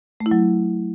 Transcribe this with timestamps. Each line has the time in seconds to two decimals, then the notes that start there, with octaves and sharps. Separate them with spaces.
0.20 A3
0.26 E4
0.31 F#3